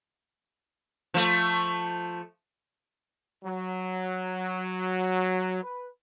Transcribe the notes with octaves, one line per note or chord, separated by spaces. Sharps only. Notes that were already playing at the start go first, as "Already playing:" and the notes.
F3 A3
F#3
B4